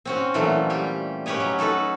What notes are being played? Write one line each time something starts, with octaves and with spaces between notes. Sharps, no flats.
C4 C#4 F#4
A#2 E3 F#3 A3
G3 G4
C#4 G4 B4 C#5 D#5
F#3
D#4 F#4 A4 B4